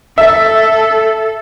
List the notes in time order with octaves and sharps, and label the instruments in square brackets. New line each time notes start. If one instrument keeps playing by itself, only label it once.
[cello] A4 [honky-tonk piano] E5